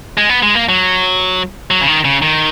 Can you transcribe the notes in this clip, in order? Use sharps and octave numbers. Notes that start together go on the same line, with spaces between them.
G#3
B3
G#3
A#3
F#3
F#3
C#3
D#3
C#3
D#3